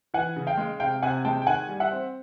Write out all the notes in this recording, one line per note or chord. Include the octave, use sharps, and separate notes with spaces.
E3 F#5 G#5
C#3
F5 G5
G#3
C3 F5 G5
C3 F#5 G#5
G#3 G5 A5
G5
D#3 F#5 G#5
G3
E5 F#5
C4